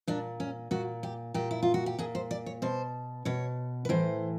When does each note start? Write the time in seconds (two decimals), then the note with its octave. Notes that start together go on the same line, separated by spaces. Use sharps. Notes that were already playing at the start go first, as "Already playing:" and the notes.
0.08 A#2 D4
0.40 C#4
0.71 A#2 F#4
1.03 G4
1.34 A#2 G4
1.51 E4
1.63 F4
1.74 F#4
1.86 G4
1.98 A#2 G#4
2.15 C5
2.31 D5
2.46 C#5
2.62 B2 C5
3.25 B2 C#5
3.85 B4
3.89 A2 E3 C5